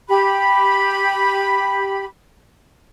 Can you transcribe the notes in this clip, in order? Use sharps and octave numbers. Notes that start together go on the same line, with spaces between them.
G4 B5